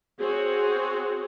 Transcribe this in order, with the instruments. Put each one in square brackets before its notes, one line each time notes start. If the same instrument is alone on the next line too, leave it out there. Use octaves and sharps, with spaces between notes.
[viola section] C4 F#4 G#4 C#5